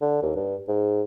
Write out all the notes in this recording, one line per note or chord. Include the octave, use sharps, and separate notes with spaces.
D3
D#2
G2
G#2